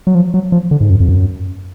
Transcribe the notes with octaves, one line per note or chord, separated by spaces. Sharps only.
F#3
F3
F#3
F3
D3
G#2
F#2
F2
F#2